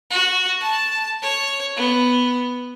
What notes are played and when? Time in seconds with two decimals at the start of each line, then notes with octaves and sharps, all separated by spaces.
0.11 F#4
0.60 A5
1.22 C#5
1.77 B3